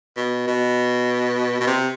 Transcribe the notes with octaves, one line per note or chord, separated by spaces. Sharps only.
B2
B2
B2
C3